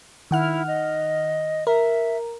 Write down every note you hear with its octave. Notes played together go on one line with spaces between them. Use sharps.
D#3 E4 F#5 F6
D#5
A#4 E5